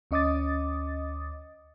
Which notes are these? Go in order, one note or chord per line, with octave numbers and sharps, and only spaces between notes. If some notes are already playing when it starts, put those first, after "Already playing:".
D2 C#4 D#5 D6 D#6 A6